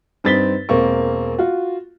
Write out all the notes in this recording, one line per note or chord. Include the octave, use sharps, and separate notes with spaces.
G2 C4 D#4 A6 B6 G7
E1 A#3 C4 C#6
F4 F#4